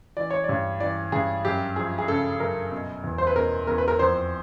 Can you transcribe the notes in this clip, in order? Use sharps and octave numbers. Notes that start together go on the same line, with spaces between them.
E3 D5
C#5
G2 D5
E3 D5
G2 G#4
F#2 G4
F3 G#4
G#4
C#3 A4
F#2 A#4
B2
E2
C5
B4
B2 A#4
E2 A#4
B4
A#4
F2 C5